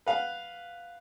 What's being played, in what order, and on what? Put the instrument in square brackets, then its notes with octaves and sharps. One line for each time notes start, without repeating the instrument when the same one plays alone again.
[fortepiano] B4 F5 F#5